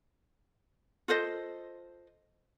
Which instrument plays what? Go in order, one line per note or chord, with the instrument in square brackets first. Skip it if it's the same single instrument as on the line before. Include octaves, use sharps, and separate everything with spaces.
[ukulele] F4 A4 C5 D#5